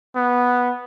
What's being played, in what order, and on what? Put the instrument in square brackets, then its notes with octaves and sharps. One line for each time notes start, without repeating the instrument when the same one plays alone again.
[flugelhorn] B3